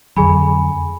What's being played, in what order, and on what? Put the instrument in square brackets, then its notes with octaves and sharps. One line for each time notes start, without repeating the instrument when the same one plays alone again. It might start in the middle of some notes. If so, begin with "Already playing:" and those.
[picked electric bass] F2 D3 F#3 [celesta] G#4 G#5 B5